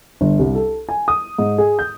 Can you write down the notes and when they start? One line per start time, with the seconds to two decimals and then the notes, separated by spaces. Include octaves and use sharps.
0.21 G1
0.39 C2
0.55 A4
0.89 G#5
1.08 D#6
1.39 G#2
1.58 G#4
1.79 G6